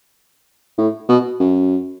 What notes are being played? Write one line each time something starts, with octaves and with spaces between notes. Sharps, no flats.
A2
B2
F#2